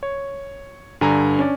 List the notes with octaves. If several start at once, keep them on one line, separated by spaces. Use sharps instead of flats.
C#5
G2 D3 G#5 A#5
C#4 D4 D5